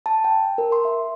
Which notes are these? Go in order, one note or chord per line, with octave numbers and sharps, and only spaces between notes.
A5
G5
A#4
C6
E5